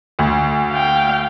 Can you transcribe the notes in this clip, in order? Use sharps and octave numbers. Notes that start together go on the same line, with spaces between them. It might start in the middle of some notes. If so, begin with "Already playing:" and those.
D2
F5 G5